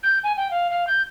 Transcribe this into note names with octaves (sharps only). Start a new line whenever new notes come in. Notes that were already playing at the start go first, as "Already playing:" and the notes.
G6
G#5
G5
F5
F5
G6